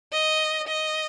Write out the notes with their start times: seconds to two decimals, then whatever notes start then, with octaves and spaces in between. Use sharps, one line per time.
0.13 D#5
0.67 D#5